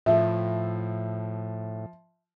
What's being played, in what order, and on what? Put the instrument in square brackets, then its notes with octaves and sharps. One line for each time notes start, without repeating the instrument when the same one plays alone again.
[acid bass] A2 [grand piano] F3 [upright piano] E5